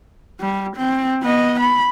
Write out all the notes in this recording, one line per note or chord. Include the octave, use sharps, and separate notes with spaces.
G3
C4
B3 D#5
B5